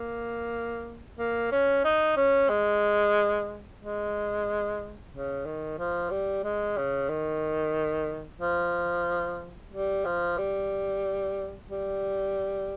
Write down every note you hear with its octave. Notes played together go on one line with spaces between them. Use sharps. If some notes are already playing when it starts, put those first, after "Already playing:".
Already playing: A#3
A#3
C#4
D#4
C#4
G#3
G#3
C#3
D#3
F3
G3
G#3
C#3
D#3
F3
G3
F3
G3
G3